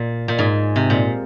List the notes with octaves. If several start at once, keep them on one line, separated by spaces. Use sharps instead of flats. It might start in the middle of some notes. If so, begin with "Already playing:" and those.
Already playing: A#2
A#2
G#2
C3
A#2